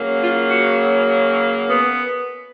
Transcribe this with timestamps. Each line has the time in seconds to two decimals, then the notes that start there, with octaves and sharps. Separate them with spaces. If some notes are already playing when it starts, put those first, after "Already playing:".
Already playing: C#3 F#3 A#3
0.21 F4
0.50 F#4
1.67 B3